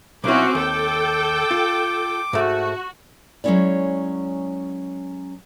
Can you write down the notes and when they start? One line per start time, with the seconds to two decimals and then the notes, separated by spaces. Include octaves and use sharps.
0.24 B1 C4 C#4 E4 F#4 D6
0.55 D#2 A4 G5
1.51 F4
2.33 G#2 A3 F#4
3.44 F#3 G#3 C4 C#4 E4 D5